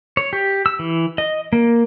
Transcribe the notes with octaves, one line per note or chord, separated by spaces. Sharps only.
C#5
G4
E6
E3
D#5
A#3